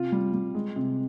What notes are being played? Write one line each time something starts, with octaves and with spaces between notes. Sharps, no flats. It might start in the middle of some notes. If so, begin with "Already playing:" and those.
Already playing: C3 F4
G3
G3
G#3
C3